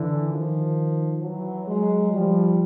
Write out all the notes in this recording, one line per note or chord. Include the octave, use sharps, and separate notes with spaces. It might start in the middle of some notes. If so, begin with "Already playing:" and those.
Already playing: D3 E3
D#3 F3
E3 F#3
F#3 G#3
F3 G3